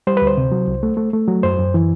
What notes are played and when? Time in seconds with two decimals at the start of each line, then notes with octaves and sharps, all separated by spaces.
0.07 G3 C5
0.17 D2 B4
0.27 C5
0.37 C3
0.52 F#3
0.68 C2
0.83 A3
0.97 A3
1.13 A3
1.28 F#3
1.43 F#2 C5
1.59 F#2
1.74 E3